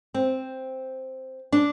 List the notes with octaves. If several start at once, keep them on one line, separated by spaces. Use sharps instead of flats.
C4
D4